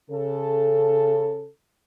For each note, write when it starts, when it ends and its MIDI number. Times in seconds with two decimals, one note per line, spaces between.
0.11 1.48 49
0.11 1.48 69